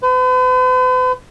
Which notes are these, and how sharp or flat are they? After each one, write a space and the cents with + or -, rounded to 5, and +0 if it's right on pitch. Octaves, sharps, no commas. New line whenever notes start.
B4 +45